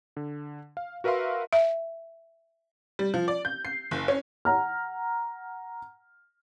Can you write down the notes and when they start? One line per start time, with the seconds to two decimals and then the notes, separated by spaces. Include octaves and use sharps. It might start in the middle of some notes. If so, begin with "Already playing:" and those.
0.17 D3
0.77 F5
1.04 F#4 A#4 B4 E5 F5 C6
1.53 E5
2.99 G3
3.14 F3
3.28 D5
3.45 G6
3.65 C7
3.91 F#1
4.08 C#4
4.45 F#5 A#5 F6